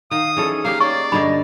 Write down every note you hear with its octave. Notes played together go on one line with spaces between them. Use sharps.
D#3 F5 D#6
E3 C#4 G#4 A4
A#3 D#4 G4 F5
C#5 D5 C#6
G2 D3 G#4 D#5 B5